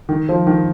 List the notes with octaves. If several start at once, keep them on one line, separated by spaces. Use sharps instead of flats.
D#3
F3
D#3